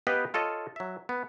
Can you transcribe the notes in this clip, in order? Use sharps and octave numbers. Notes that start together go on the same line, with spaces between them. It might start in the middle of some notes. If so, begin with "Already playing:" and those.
B3 G4 B4 D#5 F5 G5
F4 A4 C#5 D#5
F#3 E5
B3